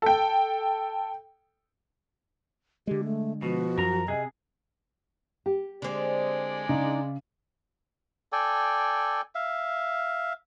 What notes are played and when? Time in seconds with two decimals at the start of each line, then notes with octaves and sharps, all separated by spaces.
0.02 A4 G5
2.87 D3 G#3 G4
3.04 A3
3.42 B2 F3 F#4
3.78 F#2 A#4 A#5
4.08 C3 G#4 D#5
5.46 G4
5.82 D3 G#3 C4 D5
6.69 C#3 D4 D#4
8.32 A4 D5 G5 G#5
9.35 E5 F5